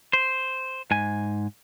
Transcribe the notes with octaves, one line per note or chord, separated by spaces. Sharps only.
C5
G#2 G#5